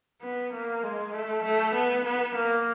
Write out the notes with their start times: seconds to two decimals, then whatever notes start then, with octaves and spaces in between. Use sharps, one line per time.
0.23 B3
0.53 A#3
0.83 G#3
1.14 A3
1.44 A3
1.74 B3
2.05 B3
2.35 A#3